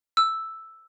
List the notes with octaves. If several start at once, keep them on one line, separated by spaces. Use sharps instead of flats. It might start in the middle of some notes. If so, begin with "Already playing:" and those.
E6